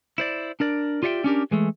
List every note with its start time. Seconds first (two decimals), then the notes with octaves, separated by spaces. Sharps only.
0.18 E4 C5 D5
0.60 D4 A#4 D5
1.03 F4 G4 D5 E5 F#5 G5
1.24 C#4 D4 G4 A#4
1.51 E3 G#3 A3